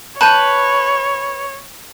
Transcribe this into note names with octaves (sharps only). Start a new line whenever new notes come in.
B4 C#5 A5 G6 D#7